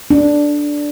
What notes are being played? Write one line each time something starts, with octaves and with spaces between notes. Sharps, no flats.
D4